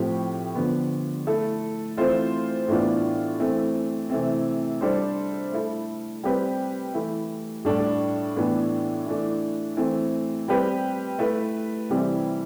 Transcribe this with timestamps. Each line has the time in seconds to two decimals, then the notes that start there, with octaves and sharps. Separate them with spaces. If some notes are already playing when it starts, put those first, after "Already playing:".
Already playing: A2 F3 C4 G4
0.55 D3 F3 B3
1.27 A3 E4 A4
1.97 E3 A3 C4 F4 C5
2.68 A2 E3 B3 D4 F4
3.39 E3 A3 C4
4.10 C3 E3 A3 C4
4.81 G3 D4 A4 C5
5.52 A3 E4 A4
6.23 G3 C4 G4 B4
6.94 E3 A3 E4
7.65 A2 G3 D4 A4
8.36 A2 E3 B3 D4
9.06 E3 A3 D4
9.77 E3 A3 C4
10.48 G3 C4 G4 B4
11.19 A3 E4 B4
11.90 C3 E3 G3 C4 G4